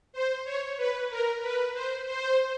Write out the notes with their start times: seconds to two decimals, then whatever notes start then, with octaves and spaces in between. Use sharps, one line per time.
0.13 C5
0.44 C#5
0.77 B4
1.09 A#4
1.42 B4
1.74 C5
2.06 C5